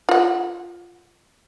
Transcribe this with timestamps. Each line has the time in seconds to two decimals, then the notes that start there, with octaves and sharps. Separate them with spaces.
0.09 F4 F#5